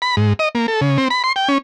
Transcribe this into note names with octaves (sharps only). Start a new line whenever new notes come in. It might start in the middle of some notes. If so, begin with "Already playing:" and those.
B5
G#2
D#5
A#3
A4
C#3
C4
B5
C6
G5
C#4